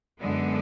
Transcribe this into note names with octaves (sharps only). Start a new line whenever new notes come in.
F#2 D3 G#3 B3